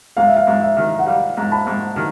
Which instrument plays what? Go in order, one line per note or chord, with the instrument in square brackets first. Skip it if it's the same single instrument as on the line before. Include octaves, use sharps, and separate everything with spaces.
[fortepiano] G#2 [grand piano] F5
[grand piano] E5
F5
[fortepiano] G#2
[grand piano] E5
[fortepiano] D#3
[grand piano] F#5
[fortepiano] G3 [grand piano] F5
[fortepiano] G#2
[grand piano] A5 B5
[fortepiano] G#2
D#3